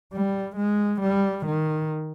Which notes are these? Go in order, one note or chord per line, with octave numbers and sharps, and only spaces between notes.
G3
G#3
G3
D#3